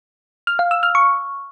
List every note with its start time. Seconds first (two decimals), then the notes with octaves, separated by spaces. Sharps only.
0.47 F6
0.59 F5
0.71 E6
0.83 F6
0.95 C#6